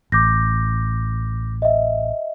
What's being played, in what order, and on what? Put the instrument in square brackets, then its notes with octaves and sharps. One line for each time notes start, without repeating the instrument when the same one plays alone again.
[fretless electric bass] A1 [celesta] D6 G6 A#6
[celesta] D#5 E5